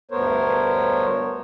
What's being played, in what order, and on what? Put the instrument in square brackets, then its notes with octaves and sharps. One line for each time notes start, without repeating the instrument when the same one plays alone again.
[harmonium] D2 G2 B3 A#4 C5 C#5